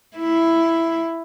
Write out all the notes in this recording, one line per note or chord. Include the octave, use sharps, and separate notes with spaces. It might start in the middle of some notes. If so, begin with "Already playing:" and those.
E4